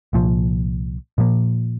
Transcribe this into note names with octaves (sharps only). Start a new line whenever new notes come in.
C2 A#2 F3
A#2 F3 A#3